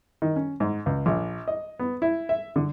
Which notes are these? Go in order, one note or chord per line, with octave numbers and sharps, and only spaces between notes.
D#3
C#4
G#2
C#2
A#1
D#5
B3
E4
E5
D3